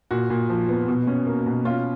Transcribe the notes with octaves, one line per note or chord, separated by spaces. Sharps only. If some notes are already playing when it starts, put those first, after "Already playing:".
A#2 F#4
A#2
F3
B3
B2
C#4
A#3
B2
C#4 F4